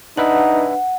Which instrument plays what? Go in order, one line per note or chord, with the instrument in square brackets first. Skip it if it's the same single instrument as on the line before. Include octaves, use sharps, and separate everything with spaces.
[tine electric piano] D4 B4 E5 [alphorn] D#4 [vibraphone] F#5